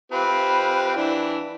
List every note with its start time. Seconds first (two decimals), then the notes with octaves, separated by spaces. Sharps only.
0.12 C4 F4 G4 B4
0.97 E3 D4 E4